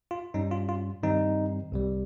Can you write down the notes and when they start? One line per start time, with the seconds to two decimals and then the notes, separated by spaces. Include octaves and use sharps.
0.11 F4
0.34 G2 G3 C#4 D#4
0.51 F4
0.69 F4
1.02 G2 D#3 G3 C4 D#4
1.72 C2 C3 G3